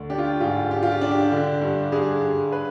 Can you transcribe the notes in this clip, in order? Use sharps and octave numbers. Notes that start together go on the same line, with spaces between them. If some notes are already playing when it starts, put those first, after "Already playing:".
Already playing: D2
D4 G4
F4
G4
G#2 F4
D4 G4
F4
G4
D4
G4
D3
G2
G2 G#4
G2
B4